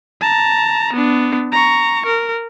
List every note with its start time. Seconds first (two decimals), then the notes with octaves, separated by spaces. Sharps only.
0.21 A5 A#5
0.93 B3 D4
1.52 A#5 C#6
2.06 A#4